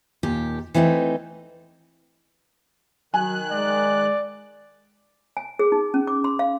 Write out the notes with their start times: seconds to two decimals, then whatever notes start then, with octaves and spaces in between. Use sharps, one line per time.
0.23 D#2 A#2 G4
0.74 E3 A3 C4 D4 D#4
3.14 D#3 F#3 G#5 F#6
3.52 G#3 D5
5.37 G#5
5.59 G#4
5.72 D#4
5.94 C#4
6.07 D6
6.24 C6
6.39 F5